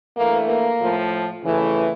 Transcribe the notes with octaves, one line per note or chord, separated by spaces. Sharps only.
G2 E3 A3 A#3
A#3
A2 F3 A3
F2 C#3 E3 A3